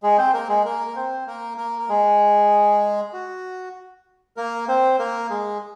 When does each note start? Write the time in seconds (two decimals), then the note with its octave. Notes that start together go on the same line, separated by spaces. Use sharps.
0.03 G#3 G#4
0.18 C4 C5
0.33 A#3 A#4
0.49 G#3 G#4
0.65 A#3 A#4
0.87 A#4
0.96 C4 C5
1.27 A#3 A#4
1.58 A#3 A#4
1.79 A#4
1.89 G#3 G#4
3.13 F#4
4.37 A#3 A#4
4.68 C4 C5
4.99 A#3 A#4
5.30 G#3 G#4